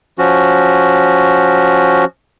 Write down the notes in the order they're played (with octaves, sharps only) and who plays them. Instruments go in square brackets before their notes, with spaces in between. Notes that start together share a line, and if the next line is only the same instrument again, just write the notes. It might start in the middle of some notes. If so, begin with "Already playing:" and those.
[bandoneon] F3 C#4 F#4